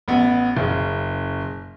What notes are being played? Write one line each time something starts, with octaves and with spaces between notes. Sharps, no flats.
A1 B3
F#1 C#3